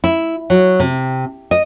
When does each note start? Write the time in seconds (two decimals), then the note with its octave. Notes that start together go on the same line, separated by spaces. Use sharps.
0.04 E4
0.50 F#3
0.80 C3
1.51 D#5